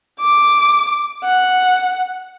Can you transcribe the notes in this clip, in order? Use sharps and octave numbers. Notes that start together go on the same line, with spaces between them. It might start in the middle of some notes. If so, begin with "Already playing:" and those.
D6
F#5